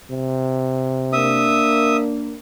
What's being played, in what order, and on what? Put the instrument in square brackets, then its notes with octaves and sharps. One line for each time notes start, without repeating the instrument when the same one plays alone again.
[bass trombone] C3
[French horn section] A#3 D4 [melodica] E5 D#6